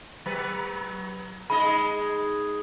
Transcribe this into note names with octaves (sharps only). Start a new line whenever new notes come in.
F#3 B4
G#3 D#4 D#5 B5